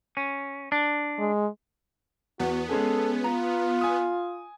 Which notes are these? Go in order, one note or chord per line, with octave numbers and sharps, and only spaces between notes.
C#4
D4
G#3
E2 B3 F#4
G#3 C#4 G#4 A4
F4 A#5
G#5 D#6